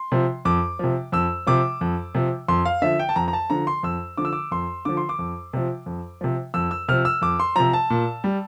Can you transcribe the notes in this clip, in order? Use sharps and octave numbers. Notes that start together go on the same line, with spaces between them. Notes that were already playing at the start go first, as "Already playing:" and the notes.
Already playing: C6
C3 F3
F2 D6
C3 F3
F2 E6
C3 F3 D6
F2
C3 F3
F2 C6
F5
D3 F3 E5
G5
A5
F2 A#5
A#5
A5
D3 F3 A#5
C6
F2 E6
D3 F3 D6
E6
D6
F2 C6
D3 F3 D6
C6
D6
F2
C3 F3
F2
C3 F3
F2 E6
E6
C3 F3 F6
E6
F2 D6
C6
C3 F3 A#5
A5
A#2
G3